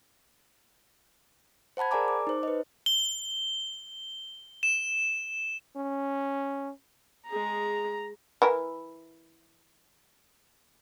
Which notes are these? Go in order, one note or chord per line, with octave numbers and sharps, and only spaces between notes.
C5 F#5 A5 B5 G#6
G#4 A#4 D5 G#5 A#5 D6
D6
D#4 C5
B4 D#5
G7
E7
C#4
G#3 G#4 A#5
E3 E4 A#4